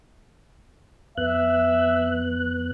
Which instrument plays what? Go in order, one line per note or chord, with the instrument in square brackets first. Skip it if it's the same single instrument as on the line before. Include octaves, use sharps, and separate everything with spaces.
[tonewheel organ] F2 B3 F#6 [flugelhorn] E5